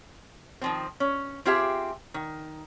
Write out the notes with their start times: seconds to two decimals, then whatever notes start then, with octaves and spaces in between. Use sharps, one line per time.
0.61 D#3 F3 C4
1.00 C#4
1.45 C4 F4 G4 G#4 E5
2.14 D#3